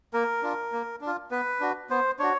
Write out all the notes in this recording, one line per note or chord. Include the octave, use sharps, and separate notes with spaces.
A#3 A#4
D4 F4
A#3
D4
F4
B3 B4
D4 F#4
B3 C5
D4 F#4 C#5